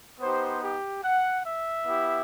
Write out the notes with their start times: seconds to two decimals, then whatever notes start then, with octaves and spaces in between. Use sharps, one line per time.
0.20 B3 D#4 G4 C5
0.62 G4
1.03 F#5
1.44 E5
1.85 B3 E4 G4